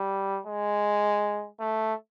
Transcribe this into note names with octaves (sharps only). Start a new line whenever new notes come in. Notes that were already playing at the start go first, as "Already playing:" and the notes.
Already playing: G3
G#3
A3